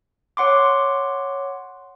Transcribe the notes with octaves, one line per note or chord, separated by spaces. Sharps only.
C#5 F#5 C6 D6